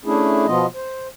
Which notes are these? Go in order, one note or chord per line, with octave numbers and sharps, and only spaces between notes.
A3 C#4 D4 E4 G#4
B2 F3 B3 F4 D#5
C5